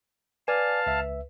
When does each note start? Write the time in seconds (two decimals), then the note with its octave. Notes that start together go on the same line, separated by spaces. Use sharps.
0.48 B4 D5 F5 G#5 A5
0.87 C#2 E5